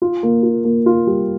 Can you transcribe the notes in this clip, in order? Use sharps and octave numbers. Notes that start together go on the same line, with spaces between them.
F4
A#3
F4
A#3
F4
G3